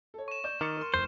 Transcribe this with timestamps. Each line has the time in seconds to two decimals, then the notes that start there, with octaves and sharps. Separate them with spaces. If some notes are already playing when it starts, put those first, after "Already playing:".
0.14 A4 C#5
0.28 C#6 E7
0.44 D5 G6 E7
0.61 D#3 D6 F6 A6 C#7
0.77 A#4 C6
0.94 F1 C5